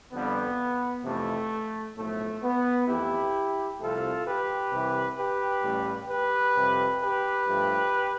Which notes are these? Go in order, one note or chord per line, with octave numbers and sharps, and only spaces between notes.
F2 D3 G3 B3
F2 C3 E3 A3
B1 A2 F3 A3
B3
F2 E3 A3 E4 G4
C2 C3 F3 A3 F4 A4
G4 B4
C2 C3 E3
G4 B4
A1 A2 G3
G4 B4
F2 C3 G3
G4 B4
G2 F3 A3